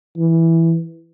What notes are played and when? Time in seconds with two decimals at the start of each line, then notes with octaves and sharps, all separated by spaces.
0.17 E3